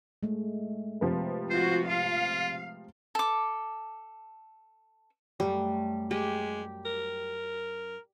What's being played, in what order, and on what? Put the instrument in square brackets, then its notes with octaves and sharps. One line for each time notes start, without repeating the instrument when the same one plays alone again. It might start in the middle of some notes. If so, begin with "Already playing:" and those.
[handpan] G#3 A3
[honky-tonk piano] C3 F3 B4
[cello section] F4 F#4 [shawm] C5
[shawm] F4 [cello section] F5
[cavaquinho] A4 D6
[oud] F#2 A3 [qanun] G3
[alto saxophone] G#3 [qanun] G4
[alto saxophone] A#4